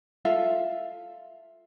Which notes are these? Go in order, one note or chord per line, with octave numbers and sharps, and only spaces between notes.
F4 A4 E5 F5